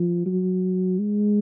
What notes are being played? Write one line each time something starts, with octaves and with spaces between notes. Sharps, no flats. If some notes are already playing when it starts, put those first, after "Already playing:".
Already playing: F3
F#3
G#3